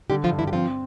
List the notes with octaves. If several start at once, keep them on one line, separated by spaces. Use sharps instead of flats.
D3 G3 G4
F3 F4
G2
E3 E4
G4
F3 C4 F4